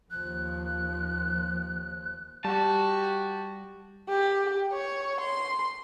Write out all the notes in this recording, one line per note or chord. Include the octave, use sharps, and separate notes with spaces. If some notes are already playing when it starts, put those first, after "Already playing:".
D#2 F3 F#6
G3 F#4 G4 A5
G4
C#5
C6